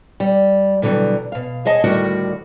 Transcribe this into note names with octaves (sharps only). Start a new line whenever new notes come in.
G3
B2 D3 E3 F#3 G3
B2 F5
G#4 C#5 D#5 A5
D2 A2 D#3 G3 F#4 F#5